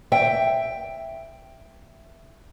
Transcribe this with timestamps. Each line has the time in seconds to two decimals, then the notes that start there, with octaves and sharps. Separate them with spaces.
0.12 E5 G5